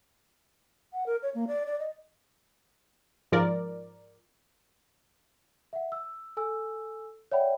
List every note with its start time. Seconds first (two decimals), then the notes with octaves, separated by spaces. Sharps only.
0.93 F#5
1.06 A#4
1.23 C#5
1.35 A#3
1.48 D5
1.66 D5
1.80 D#5
3.32 G#2 F3 A#4 D5
5.73 E5 F#5
5.92 E6
6.37 A4 G#5 E6
7.32 C#5 D5 E5 F#5 G5 B5